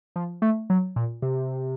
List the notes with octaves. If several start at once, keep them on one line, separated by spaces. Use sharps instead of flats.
F3
A3
F#3
A#2
C3